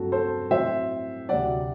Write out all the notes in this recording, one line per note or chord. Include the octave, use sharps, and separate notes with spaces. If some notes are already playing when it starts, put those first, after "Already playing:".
Already playing: G2 F#3 A3 C4 F#4 A4
A4 C5
A2 F#3 C4 C5 E5
D2 C3 F#3 D5 F#5